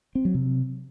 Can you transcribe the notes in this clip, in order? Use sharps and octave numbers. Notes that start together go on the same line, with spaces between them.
C4
F#3
C3